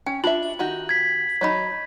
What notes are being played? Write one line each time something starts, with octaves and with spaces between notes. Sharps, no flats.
C#4 G5
D4 F4 E5 F#7
D#3 F#4 G4
G#6 B6
F#3 D#4 C#5 B5